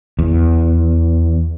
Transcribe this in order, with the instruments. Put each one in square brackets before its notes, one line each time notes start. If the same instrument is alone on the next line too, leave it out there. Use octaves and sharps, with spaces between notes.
[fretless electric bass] E2